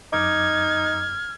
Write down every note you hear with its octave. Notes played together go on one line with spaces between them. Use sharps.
F#2 D#4 D6 F6 G#6